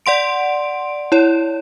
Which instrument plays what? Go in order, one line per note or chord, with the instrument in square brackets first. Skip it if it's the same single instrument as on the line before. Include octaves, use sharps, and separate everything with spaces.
[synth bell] D5 F#5 C6 D7
E4 C#5